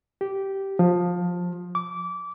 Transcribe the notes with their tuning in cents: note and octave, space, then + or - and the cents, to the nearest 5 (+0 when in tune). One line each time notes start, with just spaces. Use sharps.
G4 -10
F3 +20
D6 -20